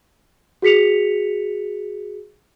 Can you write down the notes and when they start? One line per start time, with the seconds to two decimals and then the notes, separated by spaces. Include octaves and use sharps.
0.62 F#4 G#4 B6 C#7 F7